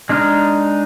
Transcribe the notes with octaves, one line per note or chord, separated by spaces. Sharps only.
G#3 D4 D#4 F6